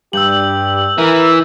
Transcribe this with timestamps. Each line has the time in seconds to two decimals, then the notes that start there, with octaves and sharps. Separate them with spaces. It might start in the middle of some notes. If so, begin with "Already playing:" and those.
0.13 G2 G4 E6 G6 F#7
0.98 E3 A#4 E5